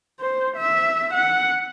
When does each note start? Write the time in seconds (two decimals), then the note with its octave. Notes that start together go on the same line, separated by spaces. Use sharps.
0.20 C5
0.57 E5
1.13 F#5